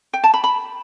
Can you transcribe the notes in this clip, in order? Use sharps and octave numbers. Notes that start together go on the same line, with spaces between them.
G5
A5
B5
B5